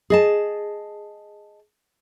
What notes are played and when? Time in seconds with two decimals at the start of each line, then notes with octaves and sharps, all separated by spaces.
0.10 G#4 D#5 A5